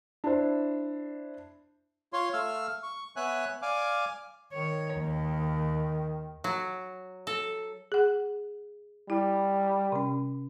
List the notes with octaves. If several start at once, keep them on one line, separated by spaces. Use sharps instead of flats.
D4 E4 C5
F4 C#5 C6
A3 F5 E6 F6
C#6
B3 C#5 E5 G#5 F#6
D5 F5 G#5 D6
D#3 C#5
D#2
F#3
A4
G#4 F#5
G3 E4
C3 C#4